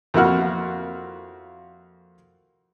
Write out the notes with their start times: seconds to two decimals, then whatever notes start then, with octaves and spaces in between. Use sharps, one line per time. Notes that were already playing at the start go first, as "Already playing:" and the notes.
0.14 F2 A#3 E4 F#4 F#5 F6